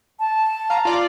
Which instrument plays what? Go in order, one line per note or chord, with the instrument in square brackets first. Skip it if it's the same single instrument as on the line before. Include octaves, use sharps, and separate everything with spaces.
[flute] A5
[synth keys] F5 A#5
F4 D5 F5